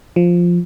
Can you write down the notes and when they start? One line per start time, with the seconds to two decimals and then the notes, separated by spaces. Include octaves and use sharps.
0.16 F3